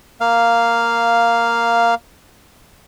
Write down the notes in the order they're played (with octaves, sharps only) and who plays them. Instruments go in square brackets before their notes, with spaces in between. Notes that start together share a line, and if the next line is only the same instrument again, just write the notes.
[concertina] A#3 F5